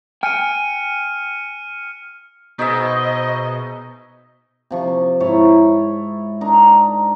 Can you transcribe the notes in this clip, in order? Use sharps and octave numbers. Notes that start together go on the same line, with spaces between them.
G5 G#5 F6 C#7 D#7
B2 D#4 G#4 C5 D#5 E5
C3 F3 C#6
G#2 E4 C#5 A5
D4 D#4 A#4